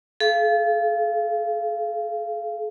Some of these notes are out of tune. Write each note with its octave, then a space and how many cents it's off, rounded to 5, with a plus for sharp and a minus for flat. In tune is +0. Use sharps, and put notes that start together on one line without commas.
A4 -35 F5 -20